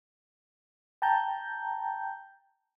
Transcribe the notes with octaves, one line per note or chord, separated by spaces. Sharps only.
G5 A5 A#5 G6